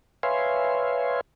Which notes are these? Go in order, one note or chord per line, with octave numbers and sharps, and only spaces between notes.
B4 C#5 E5 F5 G#5 C6